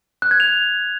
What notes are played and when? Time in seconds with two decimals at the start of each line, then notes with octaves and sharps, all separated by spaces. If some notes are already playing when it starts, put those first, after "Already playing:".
0.22 F#6
0.31 G#6
0.40 F7